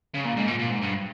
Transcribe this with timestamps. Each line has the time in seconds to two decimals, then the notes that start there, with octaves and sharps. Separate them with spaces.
0.14 C#3
0.25 A#2
0.36 G#2
0.48 A#2
0.59 A#2
0.70 G#2
0.82 G2